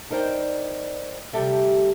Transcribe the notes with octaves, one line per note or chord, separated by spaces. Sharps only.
D#4 A#4 C5 D5 G5
D2 C3 G3 G4 A4 E5